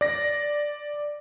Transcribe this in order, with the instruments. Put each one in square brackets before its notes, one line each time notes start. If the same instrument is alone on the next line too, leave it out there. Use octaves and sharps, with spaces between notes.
[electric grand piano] D5 A#6